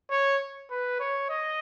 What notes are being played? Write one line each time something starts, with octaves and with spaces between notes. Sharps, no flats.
C#5
B4
C#5
D#5